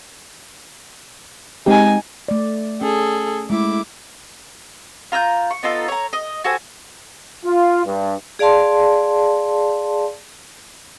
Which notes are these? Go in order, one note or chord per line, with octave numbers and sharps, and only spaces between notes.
G#3 C4 D#4 G4 G#5
A3 D5
C#4 G#4 A4
G#3 A3 E4 D6
F4 A#5 E6 G6
C#6
B3 D#4 F4 A4
C#5 A#5
D#5
F#4 A4 C5 G#5
F4
G2
G#4 D5 F5 A5 C6